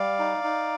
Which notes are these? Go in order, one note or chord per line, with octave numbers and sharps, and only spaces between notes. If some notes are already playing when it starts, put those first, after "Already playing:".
Already playing: G3 D5 F5
D#4
D#4